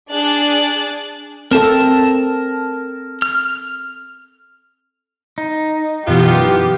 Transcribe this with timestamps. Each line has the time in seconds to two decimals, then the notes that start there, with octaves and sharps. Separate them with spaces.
0.11 D4 G#4 F#6 A6
1.51 C4 A4 A#4 A5
3.22 F6
5.38 D#4
6.08 F#2 B2 E3 B3 F4 G4